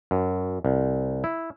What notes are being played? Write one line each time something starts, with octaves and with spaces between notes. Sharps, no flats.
F#2
C2
E4